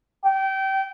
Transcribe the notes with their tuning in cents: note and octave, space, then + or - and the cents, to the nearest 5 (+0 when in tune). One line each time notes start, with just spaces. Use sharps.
G5 -25